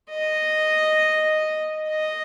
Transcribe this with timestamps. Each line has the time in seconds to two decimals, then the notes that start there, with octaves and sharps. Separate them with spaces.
0.10 D#5
1.90 D#5